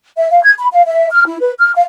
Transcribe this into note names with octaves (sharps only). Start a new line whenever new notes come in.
E5
F5
G#6
B5
F5
E5
F6
E4
B4
F6
F5